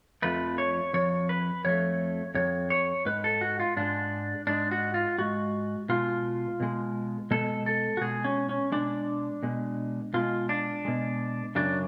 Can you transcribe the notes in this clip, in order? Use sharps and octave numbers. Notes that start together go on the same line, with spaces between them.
F2 F3 A3 B4
C#5
F2 F3 C#5
B4
F2 F3 A3 C#5
F2 F3 C#5
C#5
G#2 G#3 B4
A4
F#4
F4
G#2 G#3 D4
G#2 G#3 D4
F#4
F4
G#2 G#3 F#4
B2 G#3 F4
B2 G#3
B2 G#3 A4
A4
F#4
B2 G#3 G#4
C#4
C#4
B2 G#3 D4
B2 G#3
B2 G#3 F4
D4
B2 G#3
F#2 C#3 F#3 D4